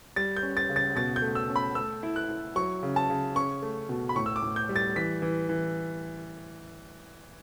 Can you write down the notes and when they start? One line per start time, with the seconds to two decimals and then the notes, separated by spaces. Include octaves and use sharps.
0.16 G3 A6
0.37 G6
0.43 C#4
0.57 A6
0.69 C#3
0.76 A6
0.96 B2 A6
1.16 G6
1.22 A3
1.35 E6
1.49 C#4
1.56 B5
1.75 A3 E6
2.03 E4
2.16 F#6
2.29 E4
2.56 F#3 C#6
2.83 C#3
2.96 A5
3.10 C#3
3.35 C#4 C#6
3.62 A3
3.89 B2
4.09 B5
4.16 A2 C#6
4.26 E6
4.36 D6
4.42 A2
4.56 G6
4.69 G3
4.76 A6
4.96 E3 B6
5.22 E3
5.49 E3